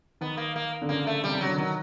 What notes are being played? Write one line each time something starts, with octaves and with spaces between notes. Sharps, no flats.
D#3 B3
A#3
A#3
D3
C#3 A#3
A3
C3 G3
C#3 F#3
D3
D#3 F#3